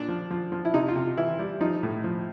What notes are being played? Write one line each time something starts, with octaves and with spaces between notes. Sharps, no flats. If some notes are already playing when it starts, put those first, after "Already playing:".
Already playing: A#2 D4
F3
F3
F3
E4
C3 D#4
F4
C3
E3 E4
G3
F3 D#4
A2
F3